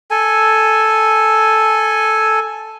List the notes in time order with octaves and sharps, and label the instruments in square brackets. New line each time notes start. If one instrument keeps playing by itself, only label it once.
[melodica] A4 G#5